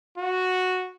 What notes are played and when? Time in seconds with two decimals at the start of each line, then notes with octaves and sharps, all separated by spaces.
0.17 F#4